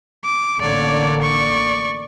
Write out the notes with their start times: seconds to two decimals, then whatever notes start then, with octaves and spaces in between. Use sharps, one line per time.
0.24 D6
0.61 A1 D3 A#3 C#5 D5
1.21 D5 C#6